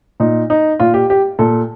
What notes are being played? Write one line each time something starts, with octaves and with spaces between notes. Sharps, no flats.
A#2 D#4
D#4
A#2 F4
G4
G4
A#2 A4